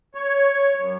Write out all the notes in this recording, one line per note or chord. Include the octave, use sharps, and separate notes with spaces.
C#5
F#2